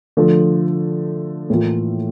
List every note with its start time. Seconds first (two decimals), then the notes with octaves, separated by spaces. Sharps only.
0.17 D3 F3 A3
1.50 A2 E3 A#3 F4